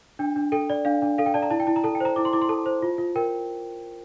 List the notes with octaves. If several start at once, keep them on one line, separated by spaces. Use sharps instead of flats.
D4 G5
D4
A4 G5
D5
D4 F5
D4
A4 F5
G5
D5 A5
A#5
E4 A5
G5
E4 A5
A#5
A4 A5
G5
C5 A#5
E4 D6
C6
E4 D6
C6
A4 A5
C5
F4
F4
A#4 G5